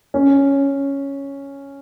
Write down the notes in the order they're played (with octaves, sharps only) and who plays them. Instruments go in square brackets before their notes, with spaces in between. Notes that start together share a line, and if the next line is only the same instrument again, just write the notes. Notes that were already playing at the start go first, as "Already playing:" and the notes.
[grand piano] C#4